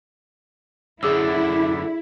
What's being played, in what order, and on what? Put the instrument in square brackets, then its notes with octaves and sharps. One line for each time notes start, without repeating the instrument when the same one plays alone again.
[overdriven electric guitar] F#2 D3 [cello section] E4 [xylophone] G#4 D6 E6